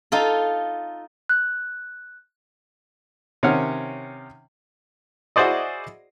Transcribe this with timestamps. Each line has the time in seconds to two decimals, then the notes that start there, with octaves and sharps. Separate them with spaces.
0.12 D#4 F4 A4
1.29 F#6
3.43 C3 D#3 C#4 C#5 F#5 F6
5.36 E4 F#4 G#4 C5 D5 D#5